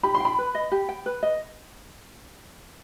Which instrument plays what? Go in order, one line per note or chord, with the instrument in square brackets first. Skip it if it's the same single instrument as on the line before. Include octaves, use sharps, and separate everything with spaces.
[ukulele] G4 [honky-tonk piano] B5
[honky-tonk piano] C6
[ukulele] G5 [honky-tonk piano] B5
[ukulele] B4
D#5
G4
G5
B4
D#5